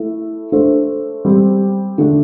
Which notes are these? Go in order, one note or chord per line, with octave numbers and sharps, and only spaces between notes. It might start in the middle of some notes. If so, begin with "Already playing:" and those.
Already playing: A3 E4 A4
A3 D4 A4 C5
G3 C4 G4
D3 A3 D4